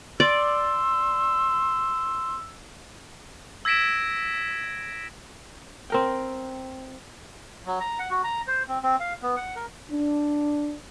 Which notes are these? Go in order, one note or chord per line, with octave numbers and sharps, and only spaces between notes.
D5 C6 E6
E6 G#6 A#6 B6 D7 E7
C4 A#4 G5
F#3
A#5
F#5
F#4
A#5
C5
C4
C4
F5
B3
F#5
A#4
D4